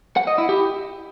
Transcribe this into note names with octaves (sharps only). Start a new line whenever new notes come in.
F#5
D#5
E4
G4